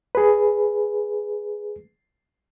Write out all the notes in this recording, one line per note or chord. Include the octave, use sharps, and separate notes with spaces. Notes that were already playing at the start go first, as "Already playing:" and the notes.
G#4 B4